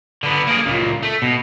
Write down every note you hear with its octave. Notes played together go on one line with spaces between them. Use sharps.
D3 B3
A#3 G#4
C#2 A#2
A3
B2